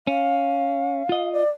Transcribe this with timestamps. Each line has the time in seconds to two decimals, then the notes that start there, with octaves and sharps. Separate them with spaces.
0.07 C#4 F5
1.09 F4 D#5
1.32 D5